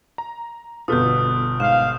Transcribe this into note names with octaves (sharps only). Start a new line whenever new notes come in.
A#5
G1 B2 F4 A4 B4 D#6 F6 G6
G#2 F5 E7